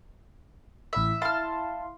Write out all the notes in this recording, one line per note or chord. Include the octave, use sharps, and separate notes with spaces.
A1 E4 E5 B6
E4 F5 A5 C6 F6